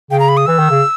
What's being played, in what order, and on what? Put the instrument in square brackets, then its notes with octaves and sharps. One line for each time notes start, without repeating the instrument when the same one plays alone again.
[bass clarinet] C#3 [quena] G5
[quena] A#5
B5
D#6
[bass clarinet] E3 [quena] E6
[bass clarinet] D#3
C#3